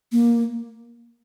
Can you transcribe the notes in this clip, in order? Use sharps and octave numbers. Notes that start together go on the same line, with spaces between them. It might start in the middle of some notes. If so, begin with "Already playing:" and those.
A#3